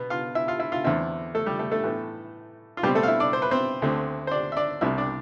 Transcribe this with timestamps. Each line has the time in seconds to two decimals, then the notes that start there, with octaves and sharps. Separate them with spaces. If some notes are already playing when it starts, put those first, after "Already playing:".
Already playing: B2 B3
0.10 F4 F5
0.35 E4 E5
0.48 F4 F5
0.59 E4 E5
0.72 F4 F5
0.84 E2 D3 A3 C4 E4 E5
1.35 A3 A4
1.46 G3 G4
1.59 A3 A4
1.71 A3 A4
1.84 A2 E3 B3
2.77 F4
2.83 B2 G3 G4
2.87 C4
2.95 A3 A4
3.03 F5
3.08 E4 E5
3.20 D4 D5
3.33 C5
3.42 B4
3.51 C4 C5
3.82 D2 D3 A3 C4
4.27 C5
4.31 D4 D5
4.52 E5
4.57 D4 D5
4.81 C2 C3 G3 E4 E5
4.98 D4 D5